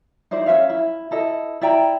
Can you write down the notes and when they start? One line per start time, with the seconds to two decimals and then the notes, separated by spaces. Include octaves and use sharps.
0.31 D#4 E4 C5 D5
0.46 C#4 F#4 E5 F5
0.70 E4
1.11 E4 A4 D#5
1.61 E4 D5 G5 A#5